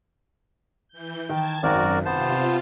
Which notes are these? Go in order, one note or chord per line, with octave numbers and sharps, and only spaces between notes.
E3 G6
D#3 G5 A5 G#6
G#1 F#2 F#4 A#4 D5
C3 B3 F4 C5 A5